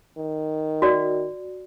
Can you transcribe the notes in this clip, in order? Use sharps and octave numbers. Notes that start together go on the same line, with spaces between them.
D#3
F#4 D5